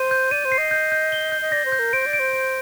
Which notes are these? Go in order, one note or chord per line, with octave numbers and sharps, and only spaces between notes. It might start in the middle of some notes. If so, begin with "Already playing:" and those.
Already playing: C5 D#7
G6
D5 D#7
C5
C7
D#5
G6
G6
G7
G6
D#5
D5 A#6
C5
G6
A#4
C5 D7
D5
D7
C5
D7